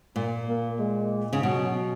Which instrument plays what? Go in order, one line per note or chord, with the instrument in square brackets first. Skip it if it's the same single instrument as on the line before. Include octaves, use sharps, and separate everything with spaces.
[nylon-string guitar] A#2 [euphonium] A#3
[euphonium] A#3
G#3
[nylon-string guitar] C#3
[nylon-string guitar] B2 [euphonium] F#3